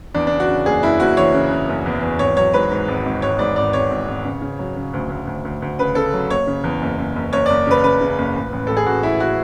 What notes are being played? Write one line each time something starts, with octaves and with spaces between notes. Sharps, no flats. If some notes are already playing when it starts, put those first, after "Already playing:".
E2 D4
C#3 D4
F#4
C#3
F#1 G#4
F#1 E4
F#1 F#4
E3 C#5
C#3
C#3
F#1
E2
E2
G#1 C#5
F#3 C#5
G#2 B4
G#2
G#1
G#1
G#1 C#5
G#2 D5
G#1 D5
G#1 C#5
G#1
G#1
C#3
C#3
F#3
C#3
D2
D2
D2
D2
D2
C#3 B4
C#3 A4
F#3
F#1 C#5
C#3
E2
F#1
F#1
F#1
F#1 C#5
F#1 D5
C#3 B4
C#3 B4
C#3
F#1
A1
A1
A1 A4
G#4
A1 F#4
A1 E4
F#4